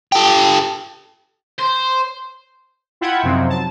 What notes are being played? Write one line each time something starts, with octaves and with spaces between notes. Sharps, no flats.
G4 A4
C5
E4 F4 F#5 G5 B5 G#6
F#2 C3 F3 F#3 C4 D#4
A5